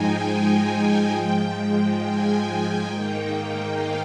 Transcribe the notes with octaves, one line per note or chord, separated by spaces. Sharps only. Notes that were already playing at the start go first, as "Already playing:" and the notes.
Already playing: G#2 F3 G#3 D#4 G5 G#5
G5
G#5
G#2 F3 G#3 G5
G5
G#5
G#5
G#2 D#3 A#3 D#4 G5
F5